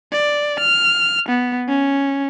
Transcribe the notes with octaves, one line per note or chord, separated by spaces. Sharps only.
D5
F6
B3
C#4